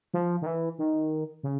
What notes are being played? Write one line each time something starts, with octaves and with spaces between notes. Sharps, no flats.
F3
D#3
E3
D#3
C#3